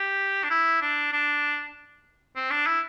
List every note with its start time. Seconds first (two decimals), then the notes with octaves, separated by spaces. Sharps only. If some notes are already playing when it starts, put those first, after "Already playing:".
Already playing: G4
0.44 D4
0.50 E4
0.81 D4
1.13 D4
2.36 C4
2.50 D4
2.66 E4